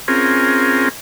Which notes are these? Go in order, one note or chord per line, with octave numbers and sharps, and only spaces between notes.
C4 C#4 F4 G#4 A#4